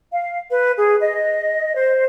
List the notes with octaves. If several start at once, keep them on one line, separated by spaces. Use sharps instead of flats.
F5
B4
G#4
D#5
C5